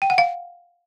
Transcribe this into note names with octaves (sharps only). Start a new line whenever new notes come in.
G5
F#5
F5